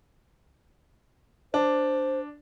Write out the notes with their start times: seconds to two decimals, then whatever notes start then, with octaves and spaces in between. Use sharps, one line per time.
1.54 D4 C5